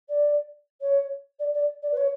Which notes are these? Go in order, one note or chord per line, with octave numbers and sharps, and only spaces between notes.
D5
C#5
D5
D5
D5
B4
C#5